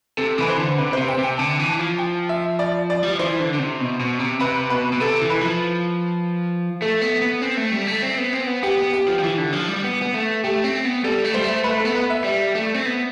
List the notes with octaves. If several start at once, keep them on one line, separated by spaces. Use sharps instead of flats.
C3 A4
E3 B4
C5
D3
C3 B4
C3 C5
G5
C3 G5
D3 A5
E3
A5
F3
G5
E5
D5
D5
G3
F3
E3 C5
D3
D3
C3
B2
B2
C3
C3 B4
B2 B4
B2
C3 A4
E3
B4
F3
A3 A4
B3
B3
C4
A3
G3
A3
C4
B3
C4
B3
B3 G4
B3
G4
F3
F3
E3
D3
F3
G3
B3
B3
A3
A3 G4
C4
B3
G3 A4
A3
G3 C5
A3
A3 B4
B3 A4
B4
E5
G3
A3
C4
B3